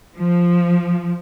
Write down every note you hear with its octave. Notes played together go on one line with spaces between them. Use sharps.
F3